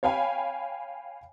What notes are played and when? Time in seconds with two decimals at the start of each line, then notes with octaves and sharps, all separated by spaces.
0.03 C#5 F5 G5 G#5 B5